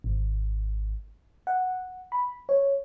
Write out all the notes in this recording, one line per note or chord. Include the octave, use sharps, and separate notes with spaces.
G#1
F#5
B5
C#5